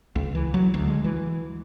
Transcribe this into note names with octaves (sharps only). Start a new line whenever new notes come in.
C#2
E3
F#3
D2
G#3
E3